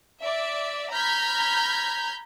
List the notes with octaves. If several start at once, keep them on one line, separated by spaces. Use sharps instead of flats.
D5 E5
A#5 B5 F6 G6 G#6 B6